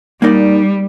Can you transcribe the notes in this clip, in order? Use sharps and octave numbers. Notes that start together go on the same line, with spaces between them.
G3 A#3 D#4 A#4 D5